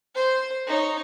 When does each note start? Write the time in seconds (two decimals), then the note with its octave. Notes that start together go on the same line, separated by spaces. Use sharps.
0.15 C5
0.67 D#4 C#5